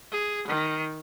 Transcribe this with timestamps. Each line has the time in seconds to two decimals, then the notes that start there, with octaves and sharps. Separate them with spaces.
0.12 G#4
0.48 D#3